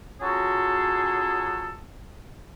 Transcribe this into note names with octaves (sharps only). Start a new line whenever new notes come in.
F#3 C#4 F4 F#4 G#4 A4